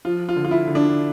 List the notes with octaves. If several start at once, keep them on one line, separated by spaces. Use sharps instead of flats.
F3 F4
F4
D3
F4
E4
D3
D4